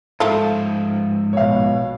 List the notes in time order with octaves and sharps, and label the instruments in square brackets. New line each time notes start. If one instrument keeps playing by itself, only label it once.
[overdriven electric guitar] G#2 F3 [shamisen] A3 F4
[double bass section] A#1 B2 [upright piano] C#5 F5